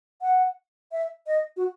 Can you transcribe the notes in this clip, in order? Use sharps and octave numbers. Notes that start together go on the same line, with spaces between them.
F#5
E5
D#5
F#4